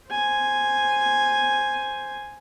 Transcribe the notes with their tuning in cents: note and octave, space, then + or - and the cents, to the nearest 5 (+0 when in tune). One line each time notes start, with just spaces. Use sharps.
C5 +0 G#5 +0